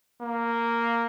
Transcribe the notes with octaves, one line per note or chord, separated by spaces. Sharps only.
A#3